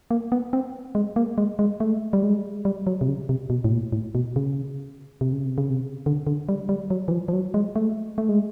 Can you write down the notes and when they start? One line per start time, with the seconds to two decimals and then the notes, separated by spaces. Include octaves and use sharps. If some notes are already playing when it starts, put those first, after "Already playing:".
0.11 A#3
0.32 B3
0.53 C4
0.95 G#3
1.16 A#3
1.38 G#3
1.59 G#3
1.80 A3
2.13 G3
2.23 G#3
2.65 G3
2.87 F#3
3.01 C3
3.08 C#3
3.29 C3
3.50 B2
3.64 A2
3.72 A#2
3.93 A2
4.15 B2
4.36 C#3
5.21 C3
5.33 C#3
5.45 C3
5.58 C#3
5.70 C3
6.06 D3
6.27 D3
6.49 G3
6.69 G3
6.90 F#3
7.08 E3
7.11 F3
7.28 F3
7.33 F#3
7.54 G#3
7.76 A3
8.18 A3
8.29 G#3